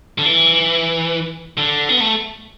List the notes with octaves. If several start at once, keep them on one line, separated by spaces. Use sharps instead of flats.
D3
E3
D3
B3
A3